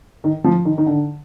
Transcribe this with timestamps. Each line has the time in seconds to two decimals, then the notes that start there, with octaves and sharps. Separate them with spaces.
0.24 D#3
0.44 F3
0.65 D#3
0.78 D#3
0.86 D3